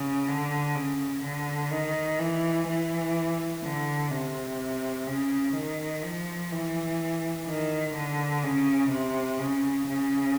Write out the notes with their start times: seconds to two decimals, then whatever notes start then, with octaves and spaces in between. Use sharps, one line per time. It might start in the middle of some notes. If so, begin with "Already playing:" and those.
Already playing: C#3
0.28 D3
0.75 C#3
1.23 D3
1.71 D#3
2.19 E3
2.67 E3
3.63 D3
4.11 C3
5.07 C#3
5.55 D#3
6.03 F3
6.51 E3
7.47 D#3
7.95 D3
8.43 C#3
8.91 C3
9.39 C#3
9.88 C#3